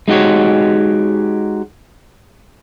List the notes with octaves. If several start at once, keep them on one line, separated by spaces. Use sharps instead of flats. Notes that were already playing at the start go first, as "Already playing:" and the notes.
G#3 D#4 F#4 G4 C#5